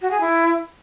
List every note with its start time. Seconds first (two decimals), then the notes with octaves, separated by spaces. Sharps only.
0.01 F#4
0.11 G#4
0.20 E4